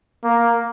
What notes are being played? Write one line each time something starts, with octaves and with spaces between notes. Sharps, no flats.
A#3